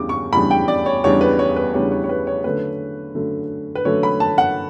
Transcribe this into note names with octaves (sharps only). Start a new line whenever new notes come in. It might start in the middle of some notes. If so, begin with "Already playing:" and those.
Already playing: E2 C#3 G3 D4 D6
C#6
E2 C#3 G3 D4 B5
G5
D5
C#5
E2 C#3 G3 D4 C#5
B4
C#5
B4
E2 C#3 G3 D4 C#5
C#5
C#5
B4
C#5
D3 F#3 A3 C#4 B4
D3 F#3 A3 C#4
B4
D3 F#3 A3 C#4 C#5
B5
A5
F#5